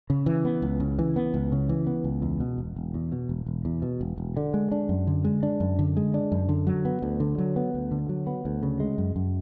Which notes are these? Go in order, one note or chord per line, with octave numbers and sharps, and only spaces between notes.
C#3
E3
B3
C#2
C#3
E3
B3
C#2
C#3
E3
B3
C#2
E2
B2
E1
E1
E2
B2
E1
E1
E2
B2
E1
E1
D3
G#3
D4
F#2
D3
G#3
D4
F#2
D3
G#3
D4
F#2
D3
F#3
B3
D2
D3
F#3
B3
D2
D3
F#3
B3
D2
C#3
G#3
F#2
F#2